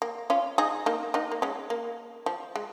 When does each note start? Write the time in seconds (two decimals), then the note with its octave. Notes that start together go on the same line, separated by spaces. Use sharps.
0.02 A#3
0.30 C#4 F4
0.58 D#4 G#4
0.86 A#3 D#4
1.14 A#3 D#4
1.32 A#3
1.42 G#3 C#4
1.70 A#3
2.26 F3
2.56 G#3